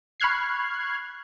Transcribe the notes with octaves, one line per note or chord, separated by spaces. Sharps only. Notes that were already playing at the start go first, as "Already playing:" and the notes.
B5 C#6 F6 F#6 G#6 C7